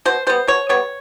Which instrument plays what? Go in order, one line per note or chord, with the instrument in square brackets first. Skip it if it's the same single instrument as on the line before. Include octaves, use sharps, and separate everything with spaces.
[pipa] B2 C5
G3 B3 C5
B2 C#5
G3 B3 C#5